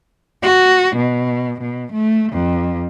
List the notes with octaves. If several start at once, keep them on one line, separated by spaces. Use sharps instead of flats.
F#4
B2
B2
A3
F2